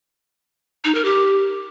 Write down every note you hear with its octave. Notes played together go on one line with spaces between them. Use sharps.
D#4
A#4
G4